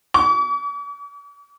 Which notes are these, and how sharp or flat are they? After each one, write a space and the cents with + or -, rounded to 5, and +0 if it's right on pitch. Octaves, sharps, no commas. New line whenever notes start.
D6 -45